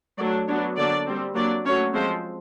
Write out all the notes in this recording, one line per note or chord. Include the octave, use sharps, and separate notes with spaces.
F#3 A3 D4 D5
F#3 B3 D4 C#5
D3 F#3 A#3 D4 D5
G3 C4
F#3 A#3 D4 D5
F#3 A3 C#4 C#5
F3 G#3 C4 C5